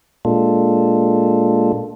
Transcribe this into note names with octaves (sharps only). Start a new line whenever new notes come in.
A#2 G#3 A#3 D4 F4 A4